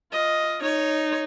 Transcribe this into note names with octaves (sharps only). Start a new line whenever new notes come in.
F4 D#5
D#4 C#5